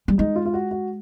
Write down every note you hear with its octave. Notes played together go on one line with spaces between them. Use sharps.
G3
G#3 D#4
F4
F4
F#4
F#4